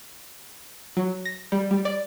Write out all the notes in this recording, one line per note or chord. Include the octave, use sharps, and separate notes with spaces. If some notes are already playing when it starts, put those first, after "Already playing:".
F#3
A#6
G3
G3
D5